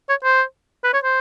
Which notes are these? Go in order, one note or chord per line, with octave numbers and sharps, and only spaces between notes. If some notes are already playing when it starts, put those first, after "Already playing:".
C#5
C5
B4
C#5
C5